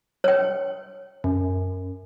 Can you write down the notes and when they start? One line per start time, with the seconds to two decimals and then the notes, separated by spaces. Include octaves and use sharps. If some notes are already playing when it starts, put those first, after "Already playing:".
0.24 C#5 G5
1.24 F#2